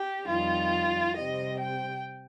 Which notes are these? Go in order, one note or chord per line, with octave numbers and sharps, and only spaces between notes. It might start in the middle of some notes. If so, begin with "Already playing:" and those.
Already playing: G4
F2 D#3 G3 F4
C3 G3 C4 D#5
G5